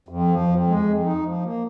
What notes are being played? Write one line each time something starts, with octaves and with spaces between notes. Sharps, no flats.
F2
F3
F2
G#3
F2
D#4
F3
A#3